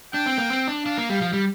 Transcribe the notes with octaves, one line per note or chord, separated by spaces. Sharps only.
D4 G5
C4
A#3
C4
D4
D4 F5
A#3
G3
F3
G3